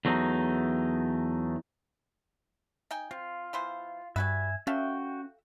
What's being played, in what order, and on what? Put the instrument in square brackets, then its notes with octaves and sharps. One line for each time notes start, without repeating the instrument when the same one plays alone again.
[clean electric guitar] E2 F#3 A3 D#4
[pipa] D#4 G5 G#5
[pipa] C4 [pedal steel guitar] F4
[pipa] E3 B3 C5
[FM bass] G2 [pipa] G3 F#4 B4 [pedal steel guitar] E5 G#5
[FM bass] C#4 [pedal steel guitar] F#4 G5 [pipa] A4 E5 F5